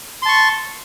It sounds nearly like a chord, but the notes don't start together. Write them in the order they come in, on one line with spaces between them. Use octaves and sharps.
C6 A5 C#6